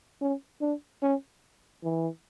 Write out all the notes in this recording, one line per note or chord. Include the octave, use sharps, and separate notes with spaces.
C#4
D4
C#4
E3